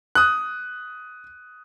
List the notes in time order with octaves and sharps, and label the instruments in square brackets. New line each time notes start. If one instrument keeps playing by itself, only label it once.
[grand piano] D#6 F#6